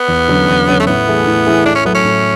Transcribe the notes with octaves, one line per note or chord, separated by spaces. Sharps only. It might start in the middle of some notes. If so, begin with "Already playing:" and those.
Already playing: B3
E2
D3 F#3 C#4
E2
D3 F#3 C#4
A3
A2 B3
E3 A3 E4 G#4
A2
E3 A3 E4 G#4
A2 D4
C#4
F#3 A3 B3
C#4
A2